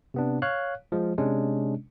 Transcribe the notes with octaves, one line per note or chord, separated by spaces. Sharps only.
C3 B3 D4
C#5 F5 F#6
F3 G#3
C3 G#3 C#4 D4